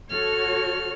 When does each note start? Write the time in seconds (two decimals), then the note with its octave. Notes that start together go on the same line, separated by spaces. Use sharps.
0.10 F#4 A4 C#5 F6